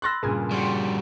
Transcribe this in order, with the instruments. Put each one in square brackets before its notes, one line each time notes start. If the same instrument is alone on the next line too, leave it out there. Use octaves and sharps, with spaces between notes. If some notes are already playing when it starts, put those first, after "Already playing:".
[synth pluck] B5 C6 E6 [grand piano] F#6 A6 A#6
[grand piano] G2 A#2 C#3 [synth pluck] G#4 A#4 G#5
[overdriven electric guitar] G3 F#4 [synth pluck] G5 C6 C#7